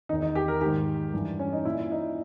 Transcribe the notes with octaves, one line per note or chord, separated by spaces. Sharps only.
E2 D#3 D#4
D#4
G4
A#4
G#2 D#3 G4
G2 E3
C#4
D#4
A#2 E4
D#4